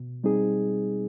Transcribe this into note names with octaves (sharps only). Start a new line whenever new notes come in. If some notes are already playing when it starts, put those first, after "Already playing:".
Already playing: B2
G3 C4 D#4 G#4